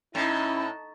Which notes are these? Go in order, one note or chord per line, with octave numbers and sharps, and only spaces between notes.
A2 C#4 D#4 E4 A5